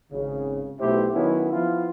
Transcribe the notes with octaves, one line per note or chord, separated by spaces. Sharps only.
G#1 C#3
B1 B2 A3 E4 G4 C5
D#3 F#3 B3 C#4 E4
F3 B3 E4 F4